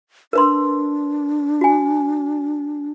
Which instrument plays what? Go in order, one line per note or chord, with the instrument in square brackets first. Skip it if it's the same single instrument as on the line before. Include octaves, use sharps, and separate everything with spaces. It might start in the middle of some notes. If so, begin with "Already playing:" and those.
[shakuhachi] D4 [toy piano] A#4 B4 C6
[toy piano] F#4 G#5